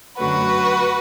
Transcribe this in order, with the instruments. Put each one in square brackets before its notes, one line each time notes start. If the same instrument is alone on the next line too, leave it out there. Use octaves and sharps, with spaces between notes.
[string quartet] F#2 D3 F#3 A3 F#4 B4